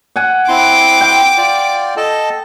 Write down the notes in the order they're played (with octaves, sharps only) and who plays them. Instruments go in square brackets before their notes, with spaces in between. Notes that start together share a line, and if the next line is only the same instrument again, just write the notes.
[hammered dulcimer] F#5 G#5
[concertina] C4 E4 C6 [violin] D6
[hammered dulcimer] G5
[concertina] F4 D5
A4 D#5 A5